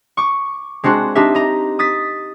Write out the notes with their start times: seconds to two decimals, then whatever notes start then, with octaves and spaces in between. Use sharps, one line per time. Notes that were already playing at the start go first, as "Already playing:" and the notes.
0.17 C#6 D6
0.83 G#3 C4 D4 F#4
1.15 C4 D4 D#4 G4 E5
1.35 D#5 A#5
1.79 D#6 A6 B6